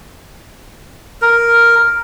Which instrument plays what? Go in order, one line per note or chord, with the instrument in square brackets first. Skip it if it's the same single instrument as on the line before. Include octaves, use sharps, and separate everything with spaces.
[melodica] A#4